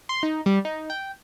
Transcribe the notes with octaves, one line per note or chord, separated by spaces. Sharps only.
C6
D#4
G3
D#4
G5